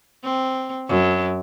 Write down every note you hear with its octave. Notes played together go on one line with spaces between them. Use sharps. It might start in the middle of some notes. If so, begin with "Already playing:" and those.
C4
F#2